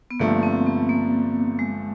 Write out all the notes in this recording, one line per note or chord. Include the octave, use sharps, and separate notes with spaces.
B3
G2 D3 F3 A3 A#3
C4
B3
A#3
G#3